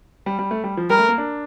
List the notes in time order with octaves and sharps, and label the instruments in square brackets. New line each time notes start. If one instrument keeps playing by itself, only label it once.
[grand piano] G3
G3
A3
G3
F3
[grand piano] G3 [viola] A#4
[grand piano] A3
A#3
D4